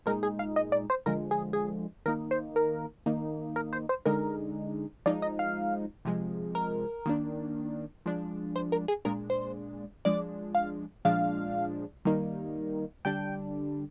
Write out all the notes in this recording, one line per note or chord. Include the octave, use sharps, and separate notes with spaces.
A#2 G#3 D#4 A#4
G#4
F5
D#5
D5
C5
D3 F3 G#3 A#4
G#4
G#4
D#3 A#3 D#4 A#4
C5
A#4
D#3 A#3 D#4
A#4
C5
C5
D3 G#3 D#4 A#4
F3 G#3 D#4 D5
D#5
F5
C3 F3 G#3
A#4
D#3 A#3 D4
F3 G#3 D4
C5
A#4
G#4
A#2 G#3 D4 A#4
C5
F3 G#3 D4 D5
F5
A#2 F3 G#3 D4 F5
D#3 G3 A#3 D#4
D3 G3 D4 G5